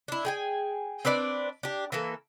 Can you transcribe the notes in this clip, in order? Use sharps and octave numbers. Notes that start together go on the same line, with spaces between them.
D4 E4
G#4 G5 G#5
C4 D4 B4 D5
D4 G4
E3 A#3 A4